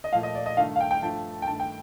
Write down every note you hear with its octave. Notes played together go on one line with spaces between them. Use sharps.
D#5
A#2 F3 A3 F5
D#5
D5
D#5
G2 D#3 A3 F5
F5
G5
G5
G2 F3 A3 A5
G5
G2 D#3 A3 A5
G5